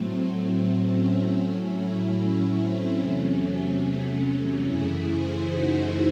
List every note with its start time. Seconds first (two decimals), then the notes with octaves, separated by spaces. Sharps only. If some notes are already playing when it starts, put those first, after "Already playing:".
Already playing: A2 F#3 A3 C4
0.50 C4
0.91 C#4
1.32 A2 F#3 A3
1.73 C#4 E4
2.15 C#4 E4
2.57 C4
2.98 E2 C3 F#3 A3 C#4
3.39 C#4
3.81 C#4
4.22 C#4
4.63 F#2 C#3 E3 A3 E4 G#4
5.05 G#4 C5
5.46 D#4 F#4